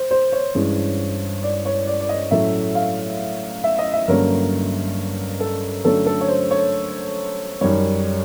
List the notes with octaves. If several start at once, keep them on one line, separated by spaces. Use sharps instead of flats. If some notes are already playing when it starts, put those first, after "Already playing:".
Already playing: C5
C5
C#5
G2 E3 G#3 C#4
D5
C#5
D5
D5
D#5
A2 F#3 A3 C#4 E5
F5
E5
D#5
E5
G2 D3 F#3 A#3 C#4 A#4
A4
D3 F#3 A3 C#4 A4
A4
C#5
C5
C#5
F#2 D#3 G3 C#5